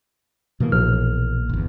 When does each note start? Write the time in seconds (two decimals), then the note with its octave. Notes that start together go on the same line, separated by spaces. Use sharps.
0.60 B2 E3 A#3
0.72 A#1 F6
1.49 G1 E2